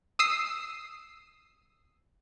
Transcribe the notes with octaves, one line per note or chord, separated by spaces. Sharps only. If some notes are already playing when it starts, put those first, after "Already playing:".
D#6 E6 C7